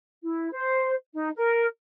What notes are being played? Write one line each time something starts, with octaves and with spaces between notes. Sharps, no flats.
E4
C5
D#4
A#4